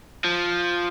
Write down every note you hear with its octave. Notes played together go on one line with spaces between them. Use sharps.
F3